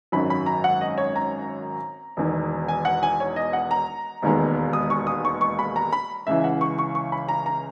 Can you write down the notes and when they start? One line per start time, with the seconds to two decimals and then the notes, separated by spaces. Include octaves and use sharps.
0.12 G#1 F#2 D#3 F#3 B5
0.30 B5
0.46 A#5
0.64 F#5
0.81 D#5
0.98 C#5
1.16 A#5
2.17 E1 E2 D#3
2.68 G#5
2.85 F#5
3.03 G#5
3.20 C#5
3.36 D#5
3.53 F#5
3.71 A#5
4.22 E1 D#2 D#3 G#3 B3
4.73 D#6
4.90 C#6
5.07 D#6
5.25 C#6
5.41 C#6
5.59 B5
5.76 A#5
5.93 B5
6.27 C#2 C#3 E3 E5
6.44 F#5
6.61 C#6
6.79 C#6
6.95 C#6
7.12 B5
7.29 A#5
7.46 A#5